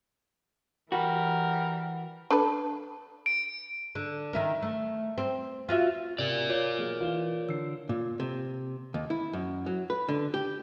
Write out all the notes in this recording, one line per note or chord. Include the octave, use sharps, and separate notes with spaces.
E3 G3 F#4 A#4
D4 A4 B4
D7
D3
D#3 E4 A#4
A3
C4
F4 F#4 E5
C3 A#4 D5
F4 C#5 D6 G6
B1 A#3 G#4
E3 F4 E7 G7
D3 E6 C7
A#2
C3
D#2
E4
F#2
F#3
B4
D3
G4